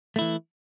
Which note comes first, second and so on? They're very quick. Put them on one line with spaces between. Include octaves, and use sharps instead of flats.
A3 E4 E3